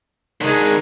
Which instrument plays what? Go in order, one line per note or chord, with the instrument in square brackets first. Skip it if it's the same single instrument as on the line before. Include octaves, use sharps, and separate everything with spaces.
[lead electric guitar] G#2 D#3 [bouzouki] G#3 D4